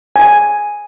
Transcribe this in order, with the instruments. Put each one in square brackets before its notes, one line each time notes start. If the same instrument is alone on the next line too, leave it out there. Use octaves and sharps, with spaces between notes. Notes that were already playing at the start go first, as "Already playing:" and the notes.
[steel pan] G#5